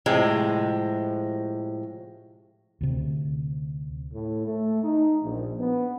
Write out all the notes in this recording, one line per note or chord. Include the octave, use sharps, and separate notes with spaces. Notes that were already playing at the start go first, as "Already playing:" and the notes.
A2 C3 F3 G#3
D2 C3
A2
A3
D#4
A#1
B3